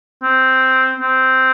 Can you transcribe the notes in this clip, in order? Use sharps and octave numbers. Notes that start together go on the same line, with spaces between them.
C4
C4